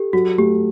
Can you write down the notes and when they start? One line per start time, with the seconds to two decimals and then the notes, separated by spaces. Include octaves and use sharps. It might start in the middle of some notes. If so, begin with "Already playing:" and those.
Already playing: G4 A4
0.13 F#3 F#4
0.38 A3 G4